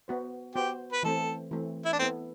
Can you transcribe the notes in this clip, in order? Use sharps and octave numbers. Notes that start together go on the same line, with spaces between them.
B3 F#4 C5
B3 F#4 G4 C5
B4
E3 A3 C4 A4
E3 A3 C4
E4
D4
B3 C4 E4 A4